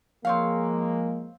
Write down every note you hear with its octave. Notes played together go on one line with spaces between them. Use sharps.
F3 G#3 A#3 C4 C#5 F5